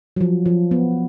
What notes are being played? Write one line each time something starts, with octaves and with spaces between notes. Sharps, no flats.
F#3
F3
F3
B3